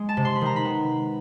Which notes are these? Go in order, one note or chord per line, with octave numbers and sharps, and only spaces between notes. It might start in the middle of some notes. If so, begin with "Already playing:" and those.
Already playing: G#3
A5
C3
C6
B5
D#3 A#5
B5
B3